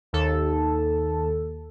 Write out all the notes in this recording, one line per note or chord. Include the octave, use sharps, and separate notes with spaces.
D#2 A4